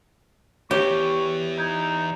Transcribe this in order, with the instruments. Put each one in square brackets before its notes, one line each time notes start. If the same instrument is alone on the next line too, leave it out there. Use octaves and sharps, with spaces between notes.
[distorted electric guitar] E2 [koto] G4 [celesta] C#5 [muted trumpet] C#6
[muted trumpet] D#4 [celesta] G6 G#6